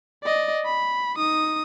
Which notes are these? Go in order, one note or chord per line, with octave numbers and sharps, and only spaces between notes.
D5 D#5
B5
D#4 D#6